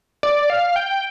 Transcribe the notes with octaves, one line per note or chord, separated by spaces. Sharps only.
D5
F5
G5